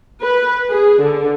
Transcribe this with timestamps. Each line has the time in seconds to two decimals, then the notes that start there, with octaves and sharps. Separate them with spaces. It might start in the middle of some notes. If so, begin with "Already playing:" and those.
0.22 B4
0.70 G#4
1.02 D3